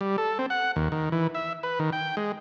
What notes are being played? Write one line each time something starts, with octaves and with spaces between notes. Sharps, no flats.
G3
A4
C4
F#5
D#2
D#3
E3
E5
B4
D#3
G5
G#3